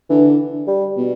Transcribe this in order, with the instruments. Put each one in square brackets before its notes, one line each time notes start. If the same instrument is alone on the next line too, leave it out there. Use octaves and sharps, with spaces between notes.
[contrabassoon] D3 [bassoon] E3
[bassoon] G3
[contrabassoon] B2